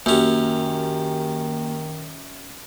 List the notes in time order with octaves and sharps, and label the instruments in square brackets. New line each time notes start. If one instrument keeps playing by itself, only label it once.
[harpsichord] F#2 C#4 [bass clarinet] D#3 [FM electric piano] A#3 G4